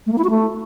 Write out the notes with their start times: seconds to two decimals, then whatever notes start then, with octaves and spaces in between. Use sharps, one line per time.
0.06 A3
0.12 A#3
0.18 E4
0.24 F#4
0.30 A3